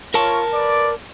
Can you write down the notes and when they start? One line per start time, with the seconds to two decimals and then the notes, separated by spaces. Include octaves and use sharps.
0.14 F4 A#4 C#5 A5
0.54 B4 D5